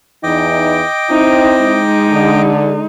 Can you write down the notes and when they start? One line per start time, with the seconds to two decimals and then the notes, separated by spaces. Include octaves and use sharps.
0.23 E2 E3 D#4 D#5 G5 D6
1.10 C4 D#4 E4
1.61 G#3 D#4
2.12 D3